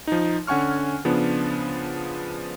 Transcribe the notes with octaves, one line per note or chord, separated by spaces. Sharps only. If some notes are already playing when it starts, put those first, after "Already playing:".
F3 D#4
D3 C#4 F#5 G#5 C#6 F6
C#3 F3 B3 D4